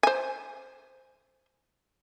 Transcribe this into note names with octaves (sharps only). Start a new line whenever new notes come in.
C5 G#5